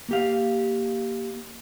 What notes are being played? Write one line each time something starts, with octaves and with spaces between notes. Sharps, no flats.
A#3 G4 F5